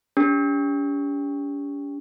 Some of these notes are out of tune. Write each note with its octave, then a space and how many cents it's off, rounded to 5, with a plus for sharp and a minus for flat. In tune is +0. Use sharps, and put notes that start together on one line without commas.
C#4 +45 G4 +25